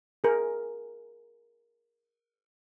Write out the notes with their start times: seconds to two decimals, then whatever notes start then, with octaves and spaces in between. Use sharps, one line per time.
0.24 G#4 A#4